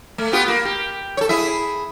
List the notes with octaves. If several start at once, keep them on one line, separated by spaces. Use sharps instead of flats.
A3
B3 F4 G4
A#3
G4
A4 C#5
E4 G#4 E5